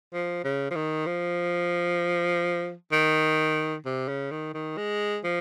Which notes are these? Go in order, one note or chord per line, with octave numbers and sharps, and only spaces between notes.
F3
C#3
F3
D#3
F3
D#3
C3
C#3
D#3
D#3
G#3
F3